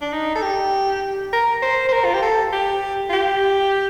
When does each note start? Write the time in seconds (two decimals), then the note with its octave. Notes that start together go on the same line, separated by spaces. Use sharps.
0.01 D4
0.12 D#4
0.35 A4
0.42 G4
1.33 A#4
1.62 C5
1.89 C5
1.93 A#4
2.05 F4
2.14 G4
2.22 A4
2.53 G4
3.09 F4
3.13 G4